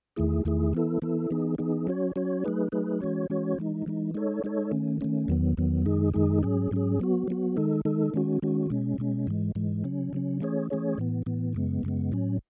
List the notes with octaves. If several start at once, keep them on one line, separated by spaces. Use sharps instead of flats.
E2 D#3 A3 E4 G#4
E2 D#3 A3 E4 G#4
E3 B3 E4 A4
E3 B3 E4 A4
E3 B3 D#4 G#4
E3 B3 D#4 G#4
F#3 C#4 F#4 C#5
F#3 C#4 F#4 C#5
F#3 A3 D#4 G#4 B4
F#3 A3 D#4 G#4 B4
E3 G#3 C#4 F#4 C#5
E3 G#3 C#4 F#4 C#5
E3 G#3 D#4
E3 G#3 D#4
G#3 D#4 A4 C#5
G#3 D#4 A4 C#5
D#3 A3 C#4
D#3 A3 C#4
E2 D#3 F#3 B3
E2 D#3 F#3 B3
F#2 D#3 G#3 D#4 G#4
F#2 D#3 G#3 D#4 G#4
G#2 F#3 C#4 G#4
G#2 F#3 C#4 G#4
F#3 B3 F#4
F#3 B3 F#4
D#3 G#3 D#4 A4
D#3 G#3 D#4 A4
D#3 G#3 C#4 F#4
D#3 G#3 C#4 F#4
B2 G#3 C#4
B2 G#3 C#4
G#2 E3 G#3
G#2 E3 G#3
C#3 F#3 C#4
C#3 F#3 C#4
E3 A3 C#4 G#4 C#5
E3 A3 C#4 G#4 C#5
A2 E3 B3
A2 E3 B3
F#2 C#3 G#3 B3
F#2 C#3 G#3 B3
A2 F#3 C#4